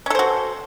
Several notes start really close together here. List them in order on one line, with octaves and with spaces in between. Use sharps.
C#4 A4 C5 F#4